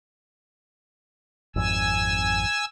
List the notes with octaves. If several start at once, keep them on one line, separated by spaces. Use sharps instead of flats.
G#1 F2 G#5 E6